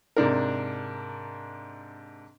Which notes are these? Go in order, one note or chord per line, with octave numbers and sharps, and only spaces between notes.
G#2 C3 D4 A#4